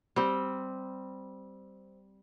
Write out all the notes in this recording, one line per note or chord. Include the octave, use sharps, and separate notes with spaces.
G3 C4